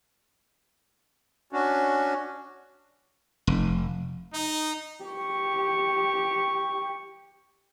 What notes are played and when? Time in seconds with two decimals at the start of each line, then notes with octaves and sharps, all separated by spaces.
1.53 C#4 D4 F#4
3.47 F1
4.34 D#4
5.05 G4 C#6